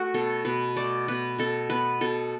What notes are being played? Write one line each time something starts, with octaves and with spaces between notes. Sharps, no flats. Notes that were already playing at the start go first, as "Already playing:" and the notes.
Already playing: A3 F#4
B2 A4
B2 B4
A3 D5
B2 B4
B2 A4
B3 B4
B2 A4